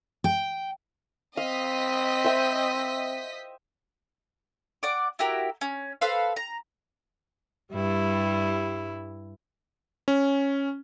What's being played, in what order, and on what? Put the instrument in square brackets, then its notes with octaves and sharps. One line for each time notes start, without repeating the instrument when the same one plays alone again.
[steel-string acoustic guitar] G5
[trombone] C4 [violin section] D#5 D#6 B6 [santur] F5
[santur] C5 E5 G5
[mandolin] D5 F#5 D6
E4 F#4 G4 A#4
C#4
A4 B4 C5 F5
A#5
[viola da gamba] G2 G3 E4
[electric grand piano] C#4